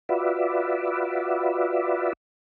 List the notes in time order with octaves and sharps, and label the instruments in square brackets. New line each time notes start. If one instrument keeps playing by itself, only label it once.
[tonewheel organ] F4 F#4 B4 D5 E5